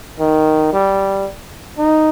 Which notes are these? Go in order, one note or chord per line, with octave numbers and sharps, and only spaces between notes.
D#3
G3
D#4